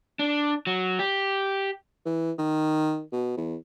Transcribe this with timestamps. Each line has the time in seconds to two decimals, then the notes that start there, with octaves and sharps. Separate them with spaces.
0.19 D4
0.67 F#3
0.99 G4
2.05 E3
2.38 D#3
3.12 B2
3.37 E2